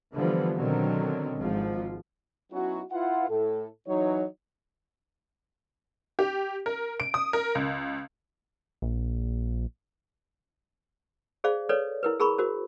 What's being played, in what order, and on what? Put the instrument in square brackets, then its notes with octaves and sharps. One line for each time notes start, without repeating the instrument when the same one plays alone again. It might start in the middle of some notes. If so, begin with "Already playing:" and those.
[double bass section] D3 E3 F3 G3 B3
B2 D3 D#3 F#3 C4
G#1 G#2 F3
[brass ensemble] F#3 B3 C#4 D#4 E4 F#4
E4 F4 B4 F#5
A2 A4
E3 F#3 D#4 C#5
[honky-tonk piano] G4
A#4
D7
D#6
A#4
C#2
[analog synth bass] A#1
[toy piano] G#4 C5 D5 F5
A4 B4 C#5 D5
E4 A#4 B4
G#4 A#4 A#5 B5 C#6
F#4 A#4 C5